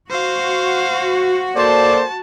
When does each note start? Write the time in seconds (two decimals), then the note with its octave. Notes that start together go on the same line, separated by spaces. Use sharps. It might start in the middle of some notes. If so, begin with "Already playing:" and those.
0.11 F#4 C5 F5
1.56 A#3 A4 C5 D5 A5